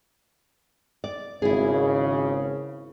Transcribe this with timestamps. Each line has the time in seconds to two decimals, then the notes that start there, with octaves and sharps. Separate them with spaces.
1.04 D5
1.42 G#1 C#3 E4 G#4